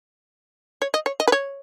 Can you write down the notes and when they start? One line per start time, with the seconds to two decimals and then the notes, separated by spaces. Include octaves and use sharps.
0.82 C#5
0.94 D#5
1.06 C#5
1.20 D#5
1.28 B4
1.32 C#5